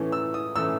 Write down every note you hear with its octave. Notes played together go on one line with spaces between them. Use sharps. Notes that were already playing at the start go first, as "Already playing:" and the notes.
Already playing: A2 E3 A3 C#4
E6
D#6
A2 E3 A3 C#4 E6